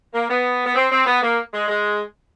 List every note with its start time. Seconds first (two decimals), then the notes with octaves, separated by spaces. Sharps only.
0.13 A#3
0.28 B3
0.65 B3
0.75 C4
0.90 C4
1.05 B3
1.22 A#3
1.52 G#3
1.68 G#3